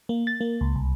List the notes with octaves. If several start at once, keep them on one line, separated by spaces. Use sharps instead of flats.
A#3
A6
A#3
C#2
C2